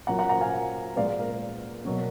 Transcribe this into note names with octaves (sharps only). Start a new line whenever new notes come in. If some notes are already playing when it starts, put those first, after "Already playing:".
A#2 F#3 A#3 F#5 A#5
F#5 A#5
F#5 A#5
F5 G#5
A#2 G#3 B3 D5 F5
A#4 D5
B2 F#3 A#3